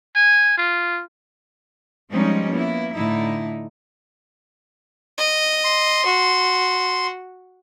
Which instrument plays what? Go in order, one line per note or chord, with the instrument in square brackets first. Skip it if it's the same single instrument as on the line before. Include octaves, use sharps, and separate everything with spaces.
[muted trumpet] G#5
F4
[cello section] F3 G3 G#3 C4 C#4 D#4
A#3 B3 E4
A2 D3 A3 D#4 E4
[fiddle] D#5
[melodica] C6
[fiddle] F#4